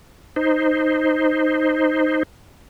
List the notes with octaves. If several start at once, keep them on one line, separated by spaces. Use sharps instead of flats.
D#4 C5